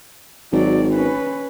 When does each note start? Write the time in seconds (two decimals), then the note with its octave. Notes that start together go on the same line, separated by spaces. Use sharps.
0.53 G#1 F#3 D5
0.93 C#4 B4